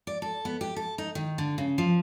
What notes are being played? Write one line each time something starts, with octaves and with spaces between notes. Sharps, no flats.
D5
A4
B3
G4
A4
D#4
D#3
D3
C#3
F3